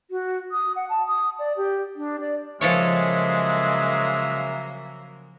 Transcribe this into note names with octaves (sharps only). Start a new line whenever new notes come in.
F#4
D#6
F#5
A5
D#6
D5
G4
D4
D5
C#3 F3 F#3 G#3 A#3 A4 C#5 E5